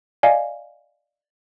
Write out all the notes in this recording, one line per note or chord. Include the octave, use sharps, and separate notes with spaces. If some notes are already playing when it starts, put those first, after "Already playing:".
D5 D#5 F5 G#5